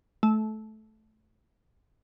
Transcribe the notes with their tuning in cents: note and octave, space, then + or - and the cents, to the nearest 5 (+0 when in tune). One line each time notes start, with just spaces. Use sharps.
A3 -20